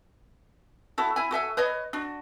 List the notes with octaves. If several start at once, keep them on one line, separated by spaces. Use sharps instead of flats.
E4 F#4 A4
E4 G#5
F#4 A4 E5 G#5
B4 C#5 D#5
D4 F#4